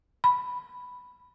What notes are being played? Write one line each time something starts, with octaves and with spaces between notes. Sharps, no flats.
B5